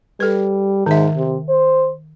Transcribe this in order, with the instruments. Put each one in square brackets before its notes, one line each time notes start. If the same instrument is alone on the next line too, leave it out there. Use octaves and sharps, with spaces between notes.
[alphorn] G3 [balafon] A4 B4
[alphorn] G#2 [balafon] D#3 E5
[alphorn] C3
C5